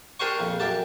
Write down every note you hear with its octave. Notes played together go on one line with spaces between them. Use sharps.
D4 G4 A#4 C5 G#5 C#6
A#1 F2
F#2 G4 D5 A5